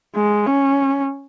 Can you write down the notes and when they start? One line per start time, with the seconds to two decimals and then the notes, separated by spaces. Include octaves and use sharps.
0.15 G#3
0.46 C#4